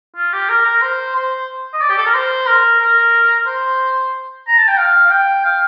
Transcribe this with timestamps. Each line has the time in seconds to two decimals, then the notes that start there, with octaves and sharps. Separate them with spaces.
0.16 F4
0.33 G4
0.49 A#4
0.65 A#4
0.82 C5
1.16 C5
1.73 D#5
1.81 D5
1.90 G4
1.97 A4
2.05 A#4
2.14 C5
2.47 A#4
2.80 A#4
3.46 C5
4.47 A#5
4.58 A5
4.68 G5
4.78 F5
5.06 F5
5.11 G5
5.44 F5